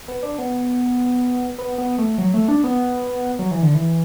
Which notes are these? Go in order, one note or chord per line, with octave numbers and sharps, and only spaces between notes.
B3
D4
B3
B3
B3
A3
F#3
A3
D4
B3
F#3
E3
D3
E3